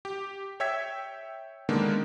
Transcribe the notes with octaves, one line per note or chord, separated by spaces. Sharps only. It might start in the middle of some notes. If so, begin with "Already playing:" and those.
G4
C#5 E5 G5 E6 G#6 B6
D3 D#3 G#3 A#3 B3 D4